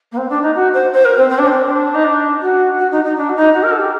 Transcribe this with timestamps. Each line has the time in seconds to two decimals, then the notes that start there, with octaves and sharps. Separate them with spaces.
0.11 A#3
0.17 C4
0.29 D4
0.42 D#4
0.54 F#4
0.73 C5
0.92 C5
1.04 A#4
1.17 C4
1.29 C4
1.38 D4
1.46 C4
1.67 D4
1.94 D#4
2.04 D4
2.41 F#4
2.78 F#4
2.91 D#4
3.04 D#4
3.17 D4
3.29 F#4
3.35 D#4
3.53 F#4
3.63 A#4
3.71 A4
3.78 G4